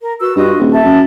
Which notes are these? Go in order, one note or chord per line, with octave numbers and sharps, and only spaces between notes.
A#4
F#4 B4 E6
G2 F4 F#4 D#5
D#1
E5 A5
F#2